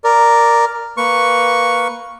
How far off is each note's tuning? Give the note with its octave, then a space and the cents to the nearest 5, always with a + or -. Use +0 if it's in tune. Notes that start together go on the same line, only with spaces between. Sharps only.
A#4 +0 D5 +0
A#3 +0 B4 +0 C#6 +0